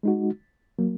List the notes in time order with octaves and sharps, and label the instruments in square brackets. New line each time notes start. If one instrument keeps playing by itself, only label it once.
[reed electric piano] G#3 D#4 F#4
F#3 A#3